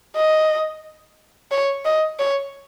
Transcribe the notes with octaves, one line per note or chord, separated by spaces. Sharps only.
D#5
C#5
D#5
C#5